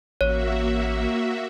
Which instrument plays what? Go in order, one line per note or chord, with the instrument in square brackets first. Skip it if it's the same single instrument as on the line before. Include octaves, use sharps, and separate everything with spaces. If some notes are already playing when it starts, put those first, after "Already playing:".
[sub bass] A1 [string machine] A#3 F#4 E5 [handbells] C#5